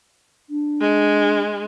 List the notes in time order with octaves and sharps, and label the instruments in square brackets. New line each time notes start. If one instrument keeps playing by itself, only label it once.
[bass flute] D4
[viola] G#3